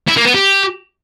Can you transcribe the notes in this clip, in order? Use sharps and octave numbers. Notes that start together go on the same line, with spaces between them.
E4
A#3
B3
G4